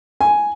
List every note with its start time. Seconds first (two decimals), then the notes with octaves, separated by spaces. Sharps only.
0.21 G#5